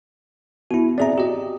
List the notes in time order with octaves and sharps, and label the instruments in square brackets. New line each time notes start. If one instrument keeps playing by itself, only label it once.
[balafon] B3 [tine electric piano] E4 F#4
[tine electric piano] C4 G#4 A#5 [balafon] D5 E5
[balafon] F#4 [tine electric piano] G4 D#5